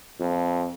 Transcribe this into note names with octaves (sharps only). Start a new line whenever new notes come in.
F2